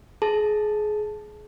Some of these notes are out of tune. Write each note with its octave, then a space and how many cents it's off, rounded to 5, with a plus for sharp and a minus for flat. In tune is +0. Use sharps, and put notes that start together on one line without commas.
G#4 +25 A5 +0